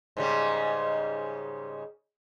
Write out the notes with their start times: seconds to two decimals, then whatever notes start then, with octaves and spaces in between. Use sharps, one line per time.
0.17 G#2 C#3 G3